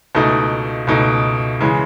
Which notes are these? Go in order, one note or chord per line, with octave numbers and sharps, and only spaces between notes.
C#2 B2 A3 D#4
C#2 B2 A3 D#4
C#3 E3 G#3